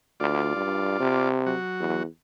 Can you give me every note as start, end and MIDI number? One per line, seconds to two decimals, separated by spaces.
0.20 0.51 38
0.20 1.29 65
0.20 1.29 74
0.56 0.95 43
1.00 1.55 48
1.46 2.03 54
1.46 2.03 66
1.80 2.06 40